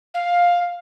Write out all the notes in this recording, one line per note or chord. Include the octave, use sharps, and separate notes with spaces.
F5